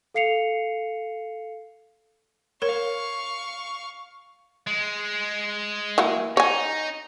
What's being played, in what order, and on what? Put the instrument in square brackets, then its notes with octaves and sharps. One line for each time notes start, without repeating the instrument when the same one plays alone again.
[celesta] A4 F5 C7 C#7 F7
[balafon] A#4 C#5 [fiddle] F5 C#6
[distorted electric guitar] G#3
[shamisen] E3 F#3 A#3
[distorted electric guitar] D#4 [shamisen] C#5 G#5